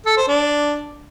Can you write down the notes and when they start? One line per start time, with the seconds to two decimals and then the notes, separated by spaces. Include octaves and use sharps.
0.06 A4
0.17 C5
0.28 D4